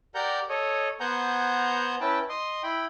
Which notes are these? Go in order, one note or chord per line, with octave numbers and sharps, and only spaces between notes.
G4 A#4 D5 F#5 A#5 G6
A4 C#5 D#5
B3 C5 F#5 G#5 A#5 G6
C#4 E4 B4 G5 A5
D#5 C6
E4 G5 B5